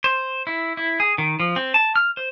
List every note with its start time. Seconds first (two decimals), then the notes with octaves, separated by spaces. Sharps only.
0.04 C5
0.47 E4
0.77 E4
1.00 G#4
1.18 D#3
1.40 F3
1.56 C4
1.74 A5
1.96 F6
2.17 C5